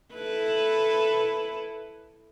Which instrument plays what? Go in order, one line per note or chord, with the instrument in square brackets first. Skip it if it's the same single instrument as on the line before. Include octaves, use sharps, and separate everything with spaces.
[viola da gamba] E4 A4 B4